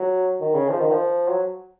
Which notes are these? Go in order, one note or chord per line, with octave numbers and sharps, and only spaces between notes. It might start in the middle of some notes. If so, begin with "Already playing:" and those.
Already playing: F#3
D#3
C#3
F3
D#3
F3
F#3